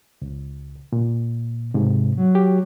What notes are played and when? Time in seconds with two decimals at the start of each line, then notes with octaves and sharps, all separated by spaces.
0.22 C#2
0.92 A#2
1.74 G#2 C3
2.17 F#3
2.35 G4